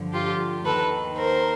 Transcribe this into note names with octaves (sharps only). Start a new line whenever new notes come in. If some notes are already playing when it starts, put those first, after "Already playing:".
Already playing: G2 D3 F3
F4 G4
D#2 D#3 A4 B4
A#4 C5